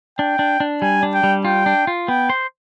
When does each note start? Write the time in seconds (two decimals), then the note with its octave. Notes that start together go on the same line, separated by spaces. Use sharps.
0.19 D4 G5
0.39 D4
0.60 D4
0.82 G3 G#5
1.03 D4
1.14 G5
1.24 G3
1.45 F4 G5
1.66 D4
1.87 F4
2.08 B3 G5
2.30 C5